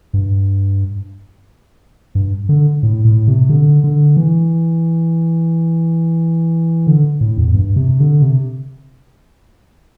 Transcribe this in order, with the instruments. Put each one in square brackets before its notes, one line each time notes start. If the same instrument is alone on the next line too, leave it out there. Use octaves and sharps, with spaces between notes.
[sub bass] G2
G2
D3
A2
A2
C3
D3
D3
E3
D3
A2
E2
G2
C3
D3
C3